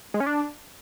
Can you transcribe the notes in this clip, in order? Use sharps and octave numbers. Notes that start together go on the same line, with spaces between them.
G#3
C#4
D4